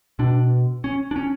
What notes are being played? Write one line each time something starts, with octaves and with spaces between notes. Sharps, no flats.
B2 D4
C#4
D4
C#4